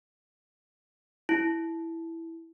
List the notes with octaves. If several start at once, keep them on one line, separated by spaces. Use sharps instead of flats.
E4